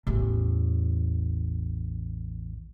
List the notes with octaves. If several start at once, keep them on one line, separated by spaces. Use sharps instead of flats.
A1 E2